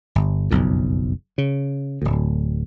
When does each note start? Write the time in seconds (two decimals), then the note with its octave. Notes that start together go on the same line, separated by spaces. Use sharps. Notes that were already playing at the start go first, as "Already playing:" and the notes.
0.15 G1
0.51 F#1 B1 F2
1.38 C#3
2.02 D1 D2